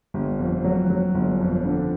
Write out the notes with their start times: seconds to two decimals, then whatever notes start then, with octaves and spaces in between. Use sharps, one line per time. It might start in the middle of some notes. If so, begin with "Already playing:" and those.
0.14 G1
0.39 F2
0.64 F#3
0.90 F#3
1.14 G1
1.40 F2
1.65 D3